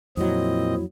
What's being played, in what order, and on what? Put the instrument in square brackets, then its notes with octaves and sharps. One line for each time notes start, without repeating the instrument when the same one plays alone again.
[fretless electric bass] F2 F#3 [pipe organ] A#2 C4 D#5 [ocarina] E4